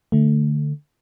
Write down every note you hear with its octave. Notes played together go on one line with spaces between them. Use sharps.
D3 A3